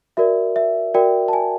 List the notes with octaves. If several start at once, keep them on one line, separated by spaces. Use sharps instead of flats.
F#4 A#4 D5 E5
E5
F#4 A#4 D5 G5
A5
G#5